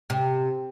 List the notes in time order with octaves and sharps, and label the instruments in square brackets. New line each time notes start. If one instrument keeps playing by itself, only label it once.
[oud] C3